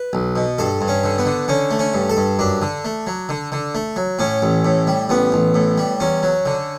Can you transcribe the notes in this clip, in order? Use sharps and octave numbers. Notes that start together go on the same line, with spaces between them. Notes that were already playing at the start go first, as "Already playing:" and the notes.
Already playing: B4
B1
B2
G2 A4
G2
C#4
D3
B3
D3
D3 C#4
A3
C#4
G2
A4
G2
F#2 D4
D3
A3
F#3
D3
D3
A3
F#3
A2 C#4
A1
A2
G3
A1 B3
A1
A2
G3
E2 C#4
F#3
D3